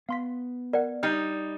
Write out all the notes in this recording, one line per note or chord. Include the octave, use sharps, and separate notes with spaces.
B3 F5 C6 B6
A#4 D5 F#5
G3 D#4 F6 C7